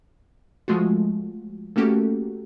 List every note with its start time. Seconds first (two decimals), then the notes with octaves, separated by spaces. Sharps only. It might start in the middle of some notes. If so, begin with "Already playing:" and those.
0.68 F3 G#3 A3 F4 F#4
1.76 A3 A#3 C#4 F#4 G4 A4